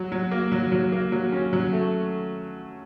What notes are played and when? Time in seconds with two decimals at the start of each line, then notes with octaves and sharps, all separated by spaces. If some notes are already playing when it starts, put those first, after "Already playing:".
Already playing: F#3
0.12 F#3
0.31 A#3
0.52 F#3
0.72 F#3
0.92 A#3
1.12 F#3
1.32 C#4
1.53 F#3
1.73 A3